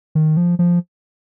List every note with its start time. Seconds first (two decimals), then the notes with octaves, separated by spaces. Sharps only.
0.15 D#3
0.37 F3
0.59 F3